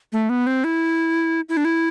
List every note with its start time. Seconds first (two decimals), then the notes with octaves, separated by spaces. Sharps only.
0.12 A3
0.29 B3
0.47 C4
0.64 E4
1.49 E4
1.57 D4
1.65 E4